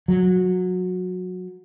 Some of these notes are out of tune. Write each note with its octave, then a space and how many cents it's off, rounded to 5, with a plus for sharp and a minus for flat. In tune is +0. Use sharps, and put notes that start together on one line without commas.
F#3 -20